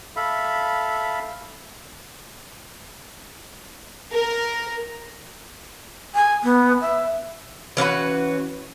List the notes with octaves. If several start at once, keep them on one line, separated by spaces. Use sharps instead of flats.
A4 E5 F5 B5
A#4
G#5
B3
E5
E3 C#4 F#4 B4